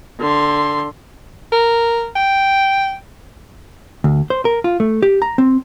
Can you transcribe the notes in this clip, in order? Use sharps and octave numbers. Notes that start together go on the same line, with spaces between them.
D3 C6
A#4
G5
D2
C5
A#4
F4
A3
G4
A#5
C4